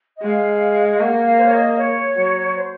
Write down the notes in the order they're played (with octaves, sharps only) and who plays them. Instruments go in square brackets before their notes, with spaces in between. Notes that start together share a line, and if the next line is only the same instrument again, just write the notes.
[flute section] D#5
[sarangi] G#3 [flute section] F5
[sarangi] A#3 [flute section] F#5
[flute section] F#5
F5
C5
C#5
D#5
C#5
[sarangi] F#3
[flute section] C5